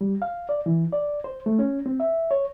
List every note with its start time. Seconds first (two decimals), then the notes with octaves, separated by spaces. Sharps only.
0.01 G3
0.22 F5
0.49 D5
0.66 E3
0.93 D5
1.24 C5
1.46 A3
1.59 C#4
1.86 C4
2.00 E5
2.31 C#5